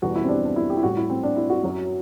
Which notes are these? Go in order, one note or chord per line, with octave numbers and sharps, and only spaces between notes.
E2 B2 G3 F#4
E4
C4
D4
D4
E4
G4
E4
A2 G3 F#4
E4
C4
D4
E4
F#4
F#2 F#3